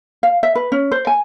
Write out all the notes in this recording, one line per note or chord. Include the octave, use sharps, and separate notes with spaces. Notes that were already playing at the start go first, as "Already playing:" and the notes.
F5
E5
B4
C#4
C5
G#5